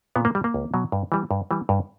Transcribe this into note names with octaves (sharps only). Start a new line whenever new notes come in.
A#2 B3
A#3
G3
A#3
C#2
B2 F#3
G2
E3 G3
G2
E3 G3
G2